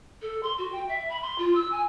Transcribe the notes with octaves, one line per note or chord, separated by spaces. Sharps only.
A4
C6
F#4
G5
E5
B5
C6
F4
E6
G#5